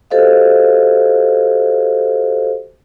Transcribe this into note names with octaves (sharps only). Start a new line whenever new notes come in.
F#4 G4 A4 C5 D#5 F5